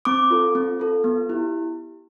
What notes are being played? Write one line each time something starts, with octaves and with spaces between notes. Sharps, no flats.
C4 D6
F4 A4
C4
F4 A4
B3
E4 G4